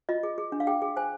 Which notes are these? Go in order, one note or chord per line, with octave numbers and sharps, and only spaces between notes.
F4 D#5
G#4
G#4
D4
F5
G#4 G5
G#4
C5 G#5